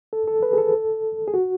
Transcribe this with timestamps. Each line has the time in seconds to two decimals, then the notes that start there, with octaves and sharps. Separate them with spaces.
0.13 A4
0.27 A4
0.43 B4
0.53 G#4
0.58 A4
1.28 G#4
1.34 F#4